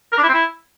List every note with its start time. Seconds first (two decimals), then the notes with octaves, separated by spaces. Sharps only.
0.12 A#4
0.18 D4
0.23 E4
0.29 C4
0.34 E4